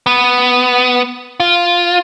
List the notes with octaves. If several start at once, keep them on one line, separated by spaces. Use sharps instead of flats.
B3
F4